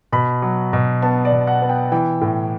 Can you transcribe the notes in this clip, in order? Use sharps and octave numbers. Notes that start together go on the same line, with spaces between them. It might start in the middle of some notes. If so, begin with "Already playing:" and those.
B2 B5
F#3
B2
B3 A5
D5
B2
F#5
B3
G5
E3 G5
A2